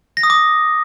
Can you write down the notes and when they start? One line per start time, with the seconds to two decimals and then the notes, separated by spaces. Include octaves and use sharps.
0.17 A#6
0.23 D#6
0.30 D6